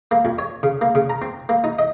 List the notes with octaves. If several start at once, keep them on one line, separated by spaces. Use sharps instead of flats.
A#3
F2
C#5
C#3
A#3
C#3
A#5
C4
A#3
D#4
D#5